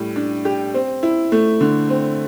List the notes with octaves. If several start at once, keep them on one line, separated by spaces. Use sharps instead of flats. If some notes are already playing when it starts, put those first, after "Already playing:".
Already playing: A2 G3
D4
G4
C4
E4
A3
D3
C4